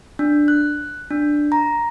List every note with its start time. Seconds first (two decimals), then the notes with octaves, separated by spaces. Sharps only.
0.19 D4
0.48 F#6
1.11 D4
1.52 A#5